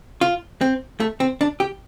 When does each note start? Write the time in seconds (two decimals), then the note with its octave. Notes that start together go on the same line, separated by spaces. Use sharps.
0.21 F4
0.61 C4
1.00 A3
1.20 C4
1.41 D4
1.60 G4